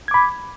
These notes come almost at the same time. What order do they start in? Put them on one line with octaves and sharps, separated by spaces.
G#6 D6 B5